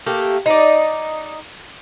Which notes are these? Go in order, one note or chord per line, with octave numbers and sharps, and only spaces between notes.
A3 A#3 G4
D#4 D5